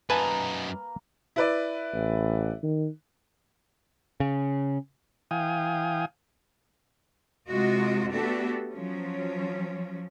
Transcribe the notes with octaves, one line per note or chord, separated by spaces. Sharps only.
F#2 A#3 D#4 B4 G#5 A5
E4 B4 D5
A1
D#3
C#3
E3 F5 G5 G#5 D#6
C3 G#3 F4 F#4 D#5
A3 B3 D4 F#4 G4 A4
F3 F#3 C#4